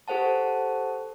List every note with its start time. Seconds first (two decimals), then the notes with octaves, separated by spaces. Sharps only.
0.08 G4 A4 C5 F#5 A5